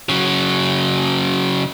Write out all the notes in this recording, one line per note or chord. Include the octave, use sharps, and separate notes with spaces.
C#3 F#3